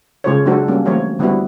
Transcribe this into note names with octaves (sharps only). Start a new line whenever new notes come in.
C#3 G#3 F4 A4 C5 C#5
F#3 G#3 D4 F#4 A4 C5
G3 A#3 C#4
E3 F#3 A3 A#3 C4 C#5
D3 G3 B3 C4 E4 F#4